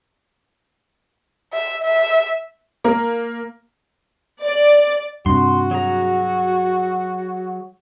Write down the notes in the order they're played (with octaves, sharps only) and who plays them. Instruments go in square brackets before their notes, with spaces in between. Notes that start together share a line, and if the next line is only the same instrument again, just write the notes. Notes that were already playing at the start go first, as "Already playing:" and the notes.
[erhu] E5
E5
[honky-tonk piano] A#3
[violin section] D5
[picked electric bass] G2 C3 [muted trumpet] F#4 [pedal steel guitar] C6
[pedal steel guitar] F#3 G#4 A#5